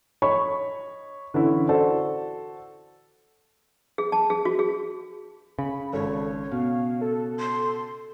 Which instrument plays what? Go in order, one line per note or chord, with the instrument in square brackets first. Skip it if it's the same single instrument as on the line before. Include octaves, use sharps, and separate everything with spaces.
[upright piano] C#5 D#5 B5 C#6
D3 E3 C#4 E4
F#4 A4 C5 D5
[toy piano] G#4
A5
G#4
F#4
G#4
[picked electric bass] C#3 [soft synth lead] B5
[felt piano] G#1 [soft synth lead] A4 [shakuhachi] C#5
[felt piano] B2 [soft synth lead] F5
[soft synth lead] A4
[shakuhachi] C6